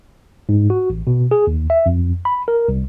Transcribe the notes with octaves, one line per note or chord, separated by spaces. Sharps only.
G#2
F#4
A1
B2
G#4
D#2
E5
F2
B5
A#4
C2